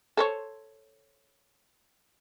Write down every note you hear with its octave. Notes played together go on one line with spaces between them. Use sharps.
A4 C5 C#5